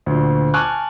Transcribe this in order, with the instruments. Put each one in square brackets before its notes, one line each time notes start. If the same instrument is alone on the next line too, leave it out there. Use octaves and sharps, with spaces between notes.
[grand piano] D2 A#2
G#5 A5 C#6 D6 F6 F#6